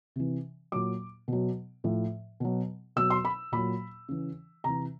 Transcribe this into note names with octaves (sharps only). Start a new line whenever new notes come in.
C3 E3
A#2 F#3 D6
B2 F#3
A2 F3
B2 F#3
B2 F#3 E6
C6
B5
A#2 F#3 B5
C#3 E3
C3 E3 A#5